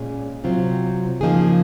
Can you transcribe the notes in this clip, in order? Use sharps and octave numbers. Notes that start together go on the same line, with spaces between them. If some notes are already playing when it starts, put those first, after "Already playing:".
Already playing: A#2 G#3 C#4 G#4
C3 F#3 C4 F4
C#3 F3 A#3 D#4 G#4